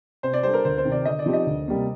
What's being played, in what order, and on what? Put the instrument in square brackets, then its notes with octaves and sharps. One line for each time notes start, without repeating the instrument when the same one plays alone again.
[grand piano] C3 [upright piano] C5
[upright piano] D5
[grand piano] G3 D4 A4 [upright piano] C5
[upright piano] A#4
[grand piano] D2 [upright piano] C5
[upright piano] C5
[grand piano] C3 D#3
[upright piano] D5
[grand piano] D3 [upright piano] D#5
[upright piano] D5
[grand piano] F3 C4 D#4 G4
[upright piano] D#5
[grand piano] D2
C3 G3 A#3